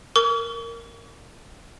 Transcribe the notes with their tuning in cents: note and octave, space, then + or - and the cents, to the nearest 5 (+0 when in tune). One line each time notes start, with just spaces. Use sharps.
A#4 -5 C#6 +45